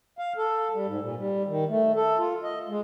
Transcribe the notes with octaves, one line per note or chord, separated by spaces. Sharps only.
F5
A4
G3
G#2
A#2
G3
D#3
A3
A4
F4
D#5
G#3